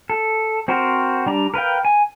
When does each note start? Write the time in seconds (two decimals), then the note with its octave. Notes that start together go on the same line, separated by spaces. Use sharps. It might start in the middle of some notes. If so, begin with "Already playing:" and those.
0.10 A4
0.68 C4 F#4 A#4 C5
1.26 G3 D4 A#5
1.54 A#4 B4 F5 G5
1.85 G#5